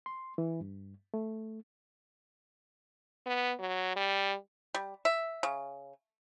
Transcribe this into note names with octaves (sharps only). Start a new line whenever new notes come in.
C6
E3
G2
A3
B3
F#3
G3
G3
E5
C#3